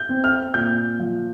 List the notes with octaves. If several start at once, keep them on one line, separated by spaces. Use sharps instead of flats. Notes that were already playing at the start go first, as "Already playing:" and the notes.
Already playing: G6
C4
F6
A#2 G6
F3